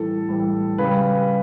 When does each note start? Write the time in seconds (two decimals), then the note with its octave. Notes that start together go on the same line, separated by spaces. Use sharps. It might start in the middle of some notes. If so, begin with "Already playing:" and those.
Already playing: A2 E3 G3 A4
0.28 A2 E3 G3
0.78 C#3 G3 B4